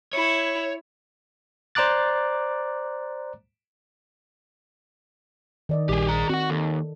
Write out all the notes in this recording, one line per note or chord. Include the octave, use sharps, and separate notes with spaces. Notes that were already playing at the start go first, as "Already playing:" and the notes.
E4 C#5
C5 D5 A#5 D6 F#6 A6
D#3 D5 D#5
A#1 G3 G4 G#4
G#4 A#5
C4 F#4 F#5
D#2 A4